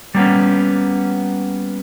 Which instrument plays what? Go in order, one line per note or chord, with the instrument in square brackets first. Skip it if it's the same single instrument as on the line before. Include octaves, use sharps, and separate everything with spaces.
[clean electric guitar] G3 A#3 B3 C#4